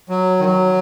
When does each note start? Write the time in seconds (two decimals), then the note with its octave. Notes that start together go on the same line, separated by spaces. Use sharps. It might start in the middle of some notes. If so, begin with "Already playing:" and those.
0.09 F#3
0.40 D#3
0.45 F#3